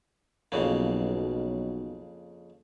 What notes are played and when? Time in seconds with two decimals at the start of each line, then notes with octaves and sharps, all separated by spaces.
0.52 B1 F2 C#3 A#3